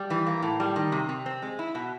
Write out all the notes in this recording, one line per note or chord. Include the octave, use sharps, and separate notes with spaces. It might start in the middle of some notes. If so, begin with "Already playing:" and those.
Already playing: G3
E3
A#3
A2
G3
D#3
C3
C3
C4
G#3
E4
B2